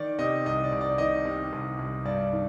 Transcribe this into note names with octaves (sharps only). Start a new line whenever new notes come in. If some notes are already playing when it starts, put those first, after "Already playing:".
Already playing: D#3 D5
C3 D#5
C2 D#5
D5
C2
D5
D#3 D#5
C3
C2
C2
G2 D5
D#3